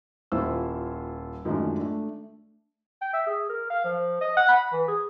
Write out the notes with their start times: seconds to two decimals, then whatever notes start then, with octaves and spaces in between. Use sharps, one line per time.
0.32 D#1 E4 F4 C5 E6
1.45 F#2 D#3 G#3 A3 D4 F4
1.78 A3 D4
3.01 G5
3.13 E5
3.27 G#4
3.49 A#4
3.70 F5
3.84 F3
4.21 D#5
4.37 F#5
4.48 B5
4.73 E3
4.88 G#4